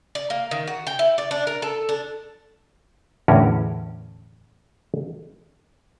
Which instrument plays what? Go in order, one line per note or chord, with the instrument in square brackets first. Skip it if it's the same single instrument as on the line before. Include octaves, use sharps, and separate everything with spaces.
[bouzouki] D5
A#3
D#3
F#4
G5
E4
D5
D4
A#4
A4
D4
[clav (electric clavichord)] E2 A2 D3 C#4 A#4